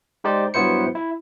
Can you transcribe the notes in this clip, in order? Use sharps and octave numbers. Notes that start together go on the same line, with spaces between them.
G#3 D#4 G4 C5 D5
G2 F#3 B3 E4 C5 C#7
E4